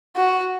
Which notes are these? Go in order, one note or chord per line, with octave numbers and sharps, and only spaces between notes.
F#4